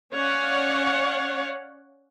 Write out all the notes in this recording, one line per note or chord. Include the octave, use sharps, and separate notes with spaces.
C#4 C#5 D5 F5 F#5